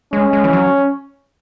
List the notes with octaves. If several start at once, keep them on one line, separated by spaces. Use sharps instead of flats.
G#3 C#4
G#3
E3
F#3